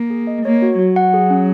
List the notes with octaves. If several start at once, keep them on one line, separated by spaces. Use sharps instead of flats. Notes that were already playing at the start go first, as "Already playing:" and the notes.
Already playing: A#3
G#4
D#5
A#3 C#5
F#4
F#3 F#4
F#5
G#4
C#4